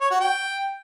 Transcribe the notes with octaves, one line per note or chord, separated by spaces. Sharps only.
C#5
F#4
G5